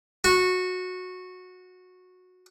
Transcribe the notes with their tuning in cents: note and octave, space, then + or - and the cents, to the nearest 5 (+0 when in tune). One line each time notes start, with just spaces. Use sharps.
F#4 -15